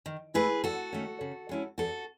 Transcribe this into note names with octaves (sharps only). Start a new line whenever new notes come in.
D#3
A3 E4 G#4 B4
E2 F#4 A4
D#3 A3 C#4
C#3
G#3 C#4 E4
E2 F#4 A4